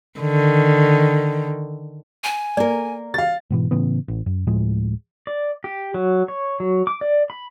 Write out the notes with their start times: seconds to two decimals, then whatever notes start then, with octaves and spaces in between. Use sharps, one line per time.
0.20 D3 D#3
2.24 G#5
2.57 A#3 A#4 D5
3.14 F5 A6
3.50 G#2 B2 E3
3.71 A2 C#3 E3 B3
4.08 A1
4.26 F#2
4.47 D2 A2 F3 G#3
5.27 D5
5.64 G4
5.94 F#3
6.28 C#5
6.60 F#3
6.87 D6
7.01 D5
7.30 B5